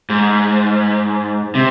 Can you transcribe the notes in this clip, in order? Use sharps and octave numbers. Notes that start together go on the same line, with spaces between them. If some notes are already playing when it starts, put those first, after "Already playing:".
G#2
C3